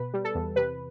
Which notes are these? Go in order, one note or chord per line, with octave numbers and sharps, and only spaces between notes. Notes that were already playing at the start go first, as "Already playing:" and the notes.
Already playing: B2 B4
G3
A4
E2
C3 B4